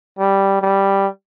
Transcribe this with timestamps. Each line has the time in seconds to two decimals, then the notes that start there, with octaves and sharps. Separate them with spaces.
0.19 G3
0.62 G3